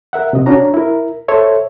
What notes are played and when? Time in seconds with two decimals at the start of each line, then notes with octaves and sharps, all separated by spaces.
0.13 A#4 E5 F#5
0.33 C3 D#5
0.46 C#4 D4 F#4 C#5 A#5
0.74 E4 A#4
1.28 A4 C5 C#5 E5